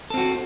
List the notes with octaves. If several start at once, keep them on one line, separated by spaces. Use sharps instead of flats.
C4 F#4 A4